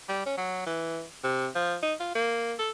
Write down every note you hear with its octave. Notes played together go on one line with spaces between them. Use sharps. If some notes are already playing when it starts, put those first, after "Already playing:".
G3
C#4
F#3
E3
C3
F3
D#4
F4
A#3
A4